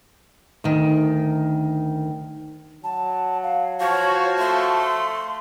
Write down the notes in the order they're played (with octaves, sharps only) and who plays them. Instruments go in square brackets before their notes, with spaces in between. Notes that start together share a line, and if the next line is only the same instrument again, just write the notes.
[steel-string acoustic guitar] D2 D#3
[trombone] F#3 [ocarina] A5
[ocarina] F5
[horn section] F3 F#4 [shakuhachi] C#5 [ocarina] F5
[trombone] A3 [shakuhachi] C6